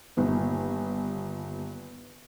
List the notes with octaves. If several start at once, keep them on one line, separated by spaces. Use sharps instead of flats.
G1 A#2 D#3 B3